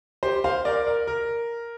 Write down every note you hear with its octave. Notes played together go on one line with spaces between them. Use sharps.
G4 C5
C5 F5
A#4 D5
A#4
A#4